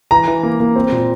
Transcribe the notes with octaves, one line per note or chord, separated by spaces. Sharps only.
E3 A#5
E3
A#3
A#3
C4
A#2